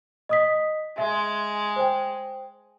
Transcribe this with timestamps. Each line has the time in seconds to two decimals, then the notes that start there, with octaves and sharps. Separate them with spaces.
0.29 D#5 D#6 B6
0.98 G#3 E5
1.76 C5 G5